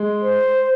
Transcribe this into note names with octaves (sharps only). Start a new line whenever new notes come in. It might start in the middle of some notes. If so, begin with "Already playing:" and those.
Already playing: G#3
C5